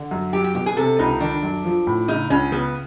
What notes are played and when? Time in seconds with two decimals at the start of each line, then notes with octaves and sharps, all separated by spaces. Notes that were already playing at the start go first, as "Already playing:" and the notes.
Already playing: D3
0.11 F#2
0.33 F#3 G4
0.44 G4
0.55 B2 G4
0.66 G#4
0.77 C3 A4
0.99 C#2 D#4
1.20 D#3 D4
1.43 F#2
1.65 F3
1.87 A2
2.08 C#3 D#4
2.30 C#2 C#4
2.52 C#3 B3